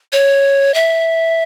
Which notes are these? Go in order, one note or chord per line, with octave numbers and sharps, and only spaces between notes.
C#5
E5